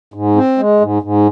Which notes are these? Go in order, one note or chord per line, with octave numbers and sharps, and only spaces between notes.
G#2
C4
G#3
G#2
G#2